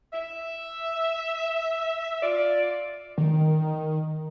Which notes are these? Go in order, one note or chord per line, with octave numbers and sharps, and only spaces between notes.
E5
F4 D5
D#3